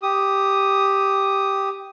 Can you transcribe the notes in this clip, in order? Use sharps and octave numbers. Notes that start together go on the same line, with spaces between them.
G4 D#6